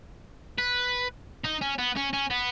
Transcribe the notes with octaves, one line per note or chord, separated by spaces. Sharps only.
B4
D#4
C#4
B3
C#4
C#4
B3